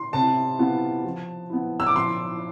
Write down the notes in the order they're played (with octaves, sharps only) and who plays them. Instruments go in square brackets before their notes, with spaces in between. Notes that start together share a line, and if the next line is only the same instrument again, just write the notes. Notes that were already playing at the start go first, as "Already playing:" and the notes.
Already playing: [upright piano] C6
[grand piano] C3 [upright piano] A5
[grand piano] E3 B3 F4
F3
B3 E4
[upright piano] E6
D6
[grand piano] F3 [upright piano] C6